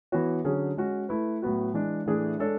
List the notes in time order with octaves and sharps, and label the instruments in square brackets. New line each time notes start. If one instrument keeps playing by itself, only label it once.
[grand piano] E3 B3 F#4 C#5
D3 F#3 C#4 G#4
G#3 C#4 F#4
A3 E4 B4
A2 F#3 B3 F#4
E3 G#3 D4
A2 E3 A3 D4 G#4
G#3 D4 A4 C#5